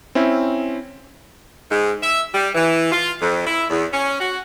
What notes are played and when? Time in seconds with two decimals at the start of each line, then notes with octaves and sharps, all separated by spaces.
0.15 C4 C#4 E4
1.70 G#2
2.00 E5
2.33 G3
2.54 E3
2.91 F4
3.20 F2
3.45 E4
3.69 E2
3.92 C#4
4.20 F#4